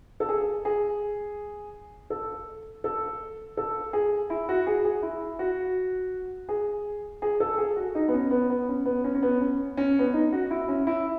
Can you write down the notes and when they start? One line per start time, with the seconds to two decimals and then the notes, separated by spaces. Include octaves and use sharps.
0.20 A4
0.29 G#4
0.65 G#4
2.10 A4
2.84 A4
3.57 A4
3.93 G#4
4.30 E4
4.49 F#4
4.67 G#4
4.85 G#4
5.02 E4
5.39 F#4
6.49 G#4
7.22 G#4
7.40 A4
7.58 G#4
7.76 F#4
7.95 D#4
8.08 B3
8.13 C#4
8.31 B3
8.50 B3
8.68 C#4
8.86 B3
9.04 C#4
9.15 C#4
9.22 B3
9.41 C#4
9.77 C#4
9.99 B3
10.06 C#4
10.14 D#4
10.32 F#4
10.51 E4
10.68 C#4
10.87 E4